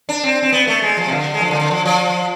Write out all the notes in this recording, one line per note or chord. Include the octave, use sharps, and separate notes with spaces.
D4
C4
C4
B3
A3
G#3
F3
C3
D3
G#3
F3
D3
D3
F3
F3